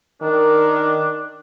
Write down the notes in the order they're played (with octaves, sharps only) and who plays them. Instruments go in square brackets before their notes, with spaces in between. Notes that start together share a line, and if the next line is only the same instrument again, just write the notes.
[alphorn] D#3 [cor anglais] D4 [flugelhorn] A#4